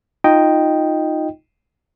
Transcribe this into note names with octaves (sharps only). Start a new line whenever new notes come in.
D#4 F4 D#5 G5